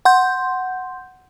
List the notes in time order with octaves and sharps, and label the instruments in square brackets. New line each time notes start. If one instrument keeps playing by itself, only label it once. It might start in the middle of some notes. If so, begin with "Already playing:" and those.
[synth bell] F#5 C6 G6